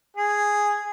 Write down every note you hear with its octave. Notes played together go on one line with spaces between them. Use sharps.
G#4